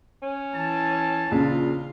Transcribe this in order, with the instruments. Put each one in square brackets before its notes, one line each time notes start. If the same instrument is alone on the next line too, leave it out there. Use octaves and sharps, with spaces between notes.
[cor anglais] C#4
[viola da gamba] E3 [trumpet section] A5
[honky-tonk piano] A#1 C#3 [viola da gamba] F4